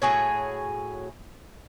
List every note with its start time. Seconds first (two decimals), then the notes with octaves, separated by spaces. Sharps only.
0.02 A2 F#4 G#4 C#5